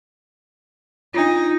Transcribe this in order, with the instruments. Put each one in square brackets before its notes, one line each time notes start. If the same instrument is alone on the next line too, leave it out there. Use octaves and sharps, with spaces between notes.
[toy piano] D4 F4 [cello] D#4